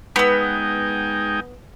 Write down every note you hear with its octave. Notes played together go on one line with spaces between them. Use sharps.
G#3 B3 D#4 G5 E6